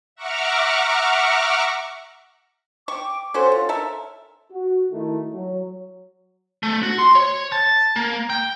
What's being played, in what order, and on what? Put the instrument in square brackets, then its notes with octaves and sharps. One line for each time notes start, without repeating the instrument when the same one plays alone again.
[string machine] E5 F#5 A#5 C#6 D6 F6
[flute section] G5 D6 [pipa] C#6
[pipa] C#4 F#4 C5 [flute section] A4 C#5
[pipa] F4
A4 A#4 E5
[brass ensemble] F#4
D#3 A3 E4
F#3
[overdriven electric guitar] A3
F#4
C6
C#5
A5
A#3
G5